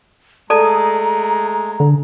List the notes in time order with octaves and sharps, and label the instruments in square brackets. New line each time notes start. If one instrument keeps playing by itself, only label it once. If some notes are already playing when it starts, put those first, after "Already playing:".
[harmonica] G#3 A3 [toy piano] A4 D5 A5 [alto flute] A#5
[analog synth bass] D3